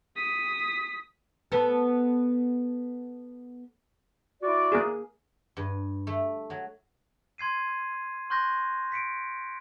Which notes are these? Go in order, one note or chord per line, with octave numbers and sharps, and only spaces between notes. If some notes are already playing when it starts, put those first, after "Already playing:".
D#6 B6
B3 A4
E4 F#4 D5
A#3 G#4
G2
A3
F#3
C6 G#6 C7 D#7
C6 C#6 F#6 G6 A#6
B6 C#7 D7